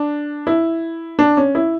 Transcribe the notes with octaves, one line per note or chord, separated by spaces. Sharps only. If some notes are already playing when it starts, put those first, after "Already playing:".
Already playing: D4
E4
D4
C#4
E4